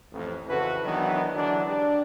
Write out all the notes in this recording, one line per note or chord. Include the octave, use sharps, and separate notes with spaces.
A1 F2
F2 C#3 E3 F#4 A4 B4
D#3 E3 F#3 B3 D4 D#4
D3 E3 F#3 G#3 D4
D4 G4